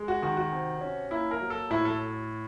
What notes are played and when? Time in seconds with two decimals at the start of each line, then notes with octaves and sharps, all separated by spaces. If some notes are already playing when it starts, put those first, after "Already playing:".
Already playing: G#3
0.08 F#4
0.22 D#3 F#4
0.37 F#4
0.52 C3
0.81 C#4
1.11 A#3 E4
1.31 A#4
1.41 F#3
1.50 A4
1.70 A2 E4
1.85 A4